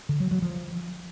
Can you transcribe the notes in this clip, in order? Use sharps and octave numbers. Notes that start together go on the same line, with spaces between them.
D3
F#3
F#3
F3